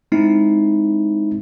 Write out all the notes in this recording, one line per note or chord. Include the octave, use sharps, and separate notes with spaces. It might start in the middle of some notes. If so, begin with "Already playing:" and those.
G#3 C4 D#4 E4